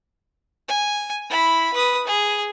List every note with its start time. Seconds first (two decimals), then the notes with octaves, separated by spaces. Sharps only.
0.68 G#5
1.30 E4 B5
1.73 B4 D#6
2.07 G#4